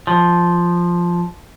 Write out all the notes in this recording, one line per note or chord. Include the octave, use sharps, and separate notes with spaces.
F3